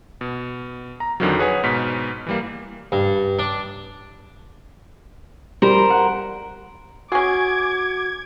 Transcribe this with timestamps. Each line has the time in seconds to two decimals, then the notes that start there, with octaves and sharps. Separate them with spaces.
0.21 B2
1.00 A#5
1.20 F2 D3 D#3 F3 F#3
1.39 G#4 B4 C#5 F#5 G#5
1.63 G#2 B2 B6
2.27 E3 G3 A#3
2.92 G2
3.39 D4
5.62 G3 A#4 C5
5.90 F#5
7.12 C#4 F#4 G#4 D6 G#6